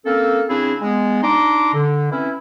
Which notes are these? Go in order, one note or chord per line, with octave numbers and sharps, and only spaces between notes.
A#3 C4 C#4 A4
C#3 C4 D4 E4 G#4
G#3 B3
D4 D#4 A#5 C6 D6
D3
E3 C4 C#4 E4